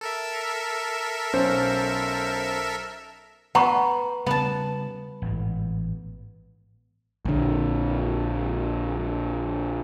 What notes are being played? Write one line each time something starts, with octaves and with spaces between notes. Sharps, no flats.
A4 A#4 E5
B1 C#4 C5
B3 F#5 A#5 C#6
C#3 G3 B3 A5
A1 G#2
A#1 D3